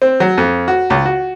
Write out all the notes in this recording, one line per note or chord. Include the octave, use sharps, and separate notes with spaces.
C4
F#3
F2
F#4
C#2
F#4